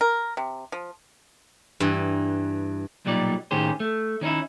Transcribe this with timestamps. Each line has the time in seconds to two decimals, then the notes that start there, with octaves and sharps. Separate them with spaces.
0.01 A#4
0.37 C3
0.72 F3
1.80 G2 E3
3.05 B1 A#2 F#3 G3 D#4 D5
3.51 A2 D#3 C#4 G4 G#4 C5
3.80 A3
4.21 D#3 C#4 D#4 E4